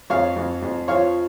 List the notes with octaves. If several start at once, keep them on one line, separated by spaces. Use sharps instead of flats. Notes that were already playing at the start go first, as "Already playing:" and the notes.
F2 C#5 F5
F2
F2
F3 C#5 F5